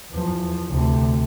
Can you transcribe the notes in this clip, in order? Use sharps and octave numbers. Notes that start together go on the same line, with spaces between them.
E2 F3
D2 C3